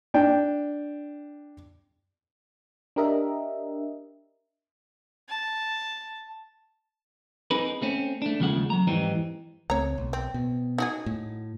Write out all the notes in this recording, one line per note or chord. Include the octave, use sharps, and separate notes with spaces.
D4 G5
D4 G4 A#4 D#5 E5
A5
C4 D#4 G#4 A#4 B4
A3 C4 C#4
A3 D4
D#2 C#3 F3 G#3 A3 F#5
F#3 A#5
F2 G#2 E3 G3 C4 D#4
C#2 A3 C4 C#5 A#5
B1
C4
B2
D#4 F#4 G#4
A2